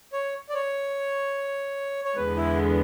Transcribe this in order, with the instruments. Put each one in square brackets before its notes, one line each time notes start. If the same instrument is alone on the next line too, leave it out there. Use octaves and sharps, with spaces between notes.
[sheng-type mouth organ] C#5
D5
C#5
C#5
[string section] E2 D3 G#3 B3 [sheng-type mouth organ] B4
[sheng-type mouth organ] E4